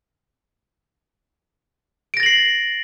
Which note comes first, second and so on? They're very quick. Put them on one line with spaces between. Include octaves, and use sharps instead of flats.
D7 A#6 A6 F#7 C7